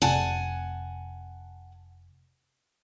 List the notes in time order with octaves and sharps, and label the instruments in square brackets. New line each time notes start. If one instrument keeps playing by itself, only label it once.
[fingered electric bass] F1 C3 [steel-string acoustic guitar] F#5 G#5 A5